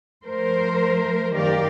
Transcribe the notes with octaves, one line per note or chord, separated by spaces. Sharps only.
F3 A3 A#4 C5
F#2 D#3 G4 A#4 D5 F5